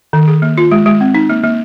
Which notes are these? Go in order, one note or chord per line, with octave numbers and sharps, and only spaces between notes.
D#3
G#4
A#3
F4
G#3
G#3
C4
D#4
A#3
A#3